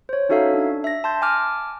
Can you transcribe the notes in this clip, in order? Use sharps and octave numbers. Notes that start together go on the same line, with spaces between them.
C5 C#5
C#4 D#4 F#4 A4 E5 F5
D4 G#6
E5 A#6
A5 C6 G6 A6
G#5 A5 D6 F6